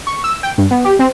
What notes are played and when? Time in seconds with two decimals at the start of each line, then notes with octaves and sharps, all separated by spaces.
0.07 C#6
0.24 E6
0.43 G5
0.58 G2
0.71 B3
0.85 G4
0.99 C4